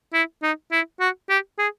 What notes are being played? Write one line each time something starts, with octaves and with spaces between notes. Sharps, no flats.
E4
D#4
E4
F#4
G4
G#4